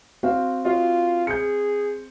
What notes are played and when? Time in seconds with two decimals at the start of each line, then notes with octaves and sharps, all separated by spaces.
0.23 C4 F#4 F5
0.65 F4 F#4 D#5
1.27 G#4 G6 C#7